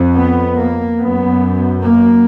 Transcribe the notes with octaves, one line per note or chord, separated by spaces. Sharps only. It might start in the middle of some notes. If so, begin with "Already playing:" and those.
Already playing: F2
B3
A#3
F#2 B3
A#3